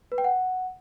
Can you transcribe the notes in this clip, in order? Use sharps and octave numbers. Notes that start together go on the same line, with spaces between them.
B4
G5
F#5